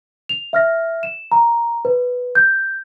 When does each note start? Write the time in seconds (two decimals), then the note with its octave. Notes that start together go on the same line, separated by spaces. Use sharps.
0.29 F7
0.53 E5 F6 A#6
1.03 E7
1.32 A#5
1.85 B4
2.35 G6